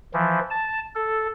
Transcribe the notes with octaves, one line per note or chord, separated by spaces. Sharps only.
E3 F3
A5
A4